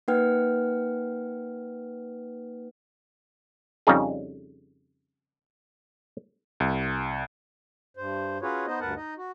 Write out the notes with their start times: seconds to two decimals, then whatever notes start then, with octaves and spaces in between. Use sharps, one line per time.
0.08 A#3 D#4 B4 F#5 G5 F6
3.87 F2 C#3 G3 D#4 G#4
6.60 C2
7.97 G2 C5
8.42 C#4 F4 F#4 G#4 B4 C#5
8.67 B3 D#4 C5 D#5
8.80 D2 G2 A#4 B4 F#5 A5
8.96 D#4 D#5
9.18 F#4